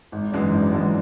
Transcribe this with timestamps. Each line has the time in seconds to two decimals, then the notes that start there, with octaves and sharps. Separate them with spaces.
0.12 G#1
0.32 F#2 E3 G#3 D4
0.51 G#1
0.71 F#2 E3 G#3 D4